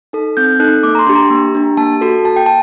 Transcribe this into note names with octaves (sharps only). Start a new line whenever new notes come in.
D#4 A4
C4 G6
D#4 A4 F#6
A#3 D6
A#5
C6
D4 G4
A#5
A#3
D4 G4
A#3 A5
F#4 A4
A#3 A5
G5
A5